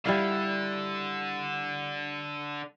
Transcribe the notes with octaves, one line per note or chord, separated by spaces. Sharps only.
D3 G3 E4 F5